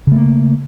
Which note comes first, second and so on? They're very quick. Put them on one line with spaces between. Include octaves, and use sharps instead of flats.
C#3 A3 A#3